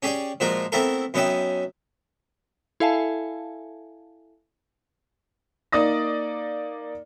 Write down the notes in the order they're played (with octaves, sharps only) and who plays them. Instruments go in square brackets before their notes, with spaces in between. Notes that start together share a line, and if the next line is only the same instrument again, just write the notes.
[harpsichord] C#4 G4 G#4 D5 G5
A#2 F3 G#3 F#4 A#4
A3 B3 C4 E4 A4 A#4
F#2 B3 C#4 D#4 E5 G5
[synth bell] E4 A4 E5 F5 G#5 A5
[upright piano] A#3 D#4 D5 D#6 A#6